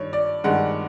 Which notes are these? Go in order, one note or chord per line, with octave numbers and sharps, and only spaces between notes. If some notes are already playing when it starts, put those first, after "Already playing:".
Already playing: G2 D#3 C#5
D5
G2 D#3 G#3 F#5